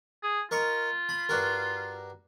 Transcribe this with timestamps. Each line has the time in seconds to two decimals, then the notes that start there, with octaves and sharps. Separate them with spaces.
0.23 G#4
0.51 F4 A#4 D#5 C#6
1.09 B5
1.29 G2 F#4 A#4